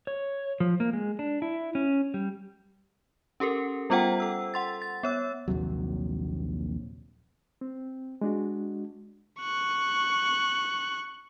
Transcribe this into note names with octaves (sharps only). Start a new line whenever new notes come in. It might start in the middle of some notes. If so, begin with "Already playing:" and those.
C#5
F3
A#3
G#3
D4
E4
C#4
G3
C#4 G4 A4 A#4
G3 B3 F4 C5 F#5 G5
A4 E6
F#5 C6 A6
A6
B3 C#5 E6
A#1 D#2 C3 F#3
C4
G#3 D4 F#4
C#6 F#6